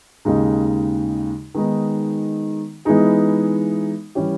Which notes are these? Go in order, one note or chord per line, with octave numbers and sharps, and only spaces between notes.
D#2 C#3 G#3 D#4
D#3 G#3 B3 D#4
E3 G#3 B3 D#4 G#4
E3 G3 C#4 G4